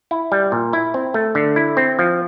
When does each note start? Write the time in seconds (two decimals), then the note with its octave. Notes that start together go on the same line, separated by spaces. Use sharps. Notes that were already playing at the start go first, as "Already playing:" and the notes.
0.11 E4
0.32 G3
0.52 A#2
0.73 E4
0.94 C4
1.14 A3
1.35 D3
1.56 E4
1.77 C4
1.99 F3